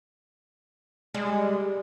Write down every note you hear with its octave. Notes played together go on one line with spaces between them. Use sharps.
G3 G#3